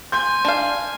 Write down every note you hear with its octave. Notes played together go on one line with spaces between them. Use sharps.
G#5 C6 G6
D4 F5